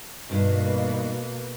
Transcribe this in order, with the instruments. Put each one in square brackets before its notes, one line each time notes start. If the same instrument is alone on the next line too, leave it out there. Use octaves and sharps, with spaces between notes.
[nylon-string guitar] G2 D#3 [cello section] B2 A#3